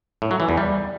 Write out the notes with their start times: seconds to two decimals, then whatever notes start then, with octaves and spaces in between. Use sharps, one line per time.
0.22 A2
0.31 F#3
0.40 E3
0.49 E2
0.57 G3